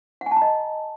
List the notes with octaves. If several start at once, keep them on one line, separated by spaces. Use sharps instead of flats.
F#5
G#5
A5
A#5
D#5